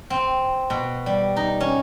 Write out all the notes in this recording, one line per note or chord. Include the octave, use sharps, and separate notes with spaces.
C4
B2
G3
D#4
C#4